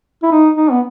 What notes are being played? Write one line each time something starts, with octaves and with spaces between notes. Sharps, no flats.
E4
D#4
D#4
B3